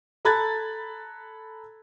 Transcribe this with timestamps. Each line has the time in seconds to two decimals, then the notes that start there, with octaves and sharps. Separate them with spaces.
0.25 A4 A#5 B5 F#6 G#6 A6